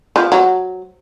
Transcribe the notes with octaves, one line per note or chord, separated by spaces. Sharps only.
F3
F#3